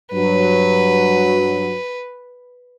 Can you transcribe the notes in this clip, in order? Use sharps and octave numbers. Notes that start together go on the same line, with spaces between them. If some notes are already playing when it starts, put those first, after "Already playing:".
G2 F#3 B4